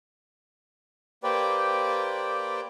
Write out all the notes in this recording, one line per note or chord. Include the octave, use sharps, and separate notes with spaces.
A#3 G4 B4 C5 D5 G5